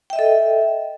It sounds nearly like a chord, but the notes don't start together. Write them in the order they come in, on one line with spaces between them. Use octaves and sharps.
G5 E5 D#5 A4